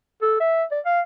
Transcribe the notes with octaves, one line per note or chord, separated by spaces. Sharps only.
A4
E5
D5
F5